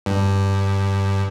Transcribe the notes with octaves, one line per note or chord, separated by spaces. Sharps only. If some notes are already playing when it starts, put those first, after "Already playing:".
G2